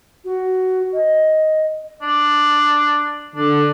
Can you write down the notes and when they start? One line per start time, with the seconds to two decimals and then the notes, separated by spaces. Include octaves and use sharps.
0.24 F#4
0.93 D#5
2.02 D4
3.36 D3 D4